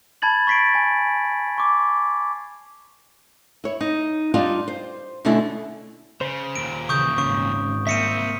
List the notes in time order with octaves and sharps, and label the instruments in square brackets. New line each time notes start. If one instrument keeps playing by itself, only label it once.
[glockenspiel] A5 B5 G#6 A6 F#7
C#6 A6 B6 C7 D7
G#5
C#6 D6
[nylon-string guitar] E4 C#5
D#4
G3 D4 D#4 F4 D5 F5
C5
B2 D3 A3 C#4 D4 E4
[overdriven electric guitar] C#3 [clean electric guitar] C5
[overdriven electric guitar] D#2 A#2 [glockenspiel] D7
[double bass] C#3 E3 [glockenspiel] C#6 D#6 G6
[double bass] G#1 [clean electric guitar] C#3 [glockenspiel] C#6
[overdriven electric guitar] C2 C4 [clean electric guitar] A#3 E5 [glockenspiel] B6 C#7 D#7